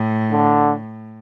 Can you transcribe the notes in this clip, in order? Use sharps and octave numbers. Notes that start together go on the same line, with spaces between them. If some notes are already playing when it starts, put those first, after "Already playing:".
Already playing: A2
D3